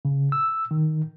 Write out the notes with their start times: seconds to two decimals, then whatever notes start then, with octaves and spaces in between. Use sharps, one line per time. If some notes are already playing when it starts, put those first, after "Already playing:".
0.05 C#3
0.32 E6
0.71 D#3